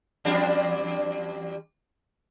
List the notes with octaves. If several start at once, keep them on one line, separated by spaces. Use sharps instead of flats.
E2 G3 D4